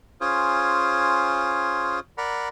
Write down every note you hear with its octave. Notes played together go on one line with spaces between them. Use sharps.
C#4 F4 G#4 C5
A#4 D5 F#5 A#5 B5